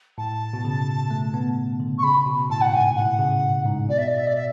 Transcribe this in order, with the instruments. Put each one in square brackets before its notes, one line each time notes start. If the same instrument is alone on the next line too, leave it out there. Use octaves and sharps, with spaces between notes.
[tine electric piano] A2 [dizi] A5
[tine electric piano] B2
C#3
A3
B3
D3
[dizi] C#6
[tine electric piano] C#3 [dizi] B5
[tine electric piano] B2
[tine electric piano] A2 [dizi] A5
[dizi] F#5
[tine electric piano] G#2 [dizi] G#5
[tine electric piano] A2 [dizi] F#5
[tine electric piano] C#3
G#2
[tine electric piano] B2 [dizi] D5
[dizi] E5
D5
E5
D5
E5